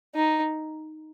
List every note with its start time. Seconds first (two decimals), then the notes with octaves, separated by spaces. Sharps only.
0.15 D#4